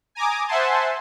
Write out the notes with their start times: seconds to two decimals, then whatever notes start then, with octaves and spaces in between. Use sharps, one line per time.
0.15 G#5 A#5 D6 D#6
0.48 C5 E5 F#5 G#5 A5 C6